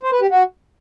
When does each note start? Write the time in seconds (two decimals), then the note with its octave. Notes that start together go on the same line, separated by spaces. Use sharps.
0.03 C5
0.12 B4
0.21 G4
0.30 F#4